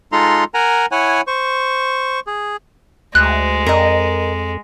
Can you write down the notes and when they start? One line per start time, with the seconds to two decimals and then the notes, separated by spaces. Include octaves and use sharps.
0.12 G#3 D#4 F4 A4 A#5 C6
0.54 A#4 F#5 G#5 A#5
0.92 E4 C#5 F#5 G#5
1.27 C5 C#6
2.27 G#4
3.15 D2 G#3 F#6
3.67 F2 A#4 D#5